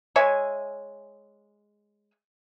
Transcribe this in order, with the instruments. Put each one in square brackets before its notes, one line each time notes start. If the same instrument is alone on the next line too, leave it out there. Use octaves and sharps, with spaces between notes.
[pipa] G#3 C#5 E5 G#5